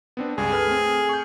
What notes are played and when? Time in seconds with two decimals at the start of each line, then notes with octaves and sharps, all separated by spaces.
0.17 B3 C4 D4
0.38 C#2 G2 G#4
0.52 A4 B4 F6
0.68 A3 C4
1.09 C#6 G6